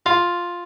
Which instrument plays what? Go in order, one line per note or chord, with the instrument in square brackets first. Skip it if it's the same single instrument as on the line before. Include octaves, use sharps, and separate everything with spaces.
[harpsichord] F4